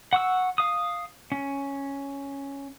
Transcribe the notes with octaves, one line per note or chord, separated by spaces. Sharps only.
F#5 C#6 E6
F5 D#6
C#4